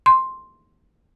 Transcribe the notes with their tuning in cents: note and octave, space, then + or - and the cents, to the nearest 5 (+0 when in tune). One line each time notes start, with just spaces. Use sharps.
C6 +5